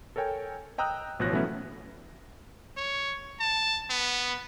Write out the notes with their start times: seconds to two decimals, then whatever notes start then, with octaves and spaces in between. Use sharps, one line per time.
0.16 A4 A#4 C#5 G5 G#5
0.78 D#5 G5 A#5 D#6 E6 F#6
1.19 A1 B2 F3 C#5 F#6 A#6
1.32 E3 F#3 A3 B3 C#4 E4
2.77 C#5
3.40 A5
3.90 B3